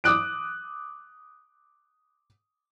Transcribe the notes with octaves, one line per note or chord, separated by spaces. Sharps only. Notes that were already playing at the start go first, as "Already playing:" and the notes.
D6 D#6 F#6 D7